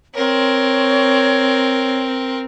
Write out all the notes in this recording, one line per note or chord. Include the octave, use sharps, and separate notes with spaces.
C4 A#4 C#5